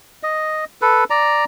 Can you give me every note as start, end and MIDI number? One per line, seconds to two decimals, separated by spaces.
0.23 0.65 75
0.82 1.04 69
0.82 1.04 71
1.10 1.45 74
1.10 1.45 82